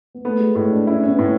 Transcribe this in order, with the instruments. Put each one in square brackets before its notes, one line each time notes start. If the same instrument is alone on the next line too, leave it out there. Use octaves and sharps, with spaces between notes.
[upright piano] B3
[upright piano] A3 [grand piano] B3
[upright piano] G#3
[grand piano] A2 [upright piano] G#3
[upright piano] D4
[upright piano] C#4 [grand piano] E4
[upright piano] C#4
B3
[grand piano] A2